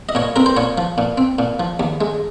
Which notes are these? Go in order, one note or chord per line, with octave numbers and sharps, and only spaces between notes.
D#5
A#2 C#5
C4 A#4
C5
A#2 C#5
F3
A#2
C4
A#2
F3
D#2
G#3